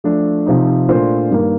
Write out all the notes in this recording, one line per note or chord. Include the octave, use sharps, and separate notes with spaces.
F3 A3 D4
C3 F3 C4 D#4
A#2 A3 D4 F4 C5
G2 D#3 A#3